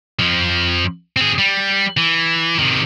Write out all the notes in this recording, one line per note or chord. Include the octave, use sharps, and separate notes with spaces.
F2 F3
C4 G#4
G3
E3
C3 D#3